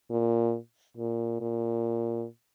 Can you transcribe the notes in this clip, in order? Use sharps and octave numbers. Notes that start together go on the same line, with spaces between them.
A#2
A#2
A#2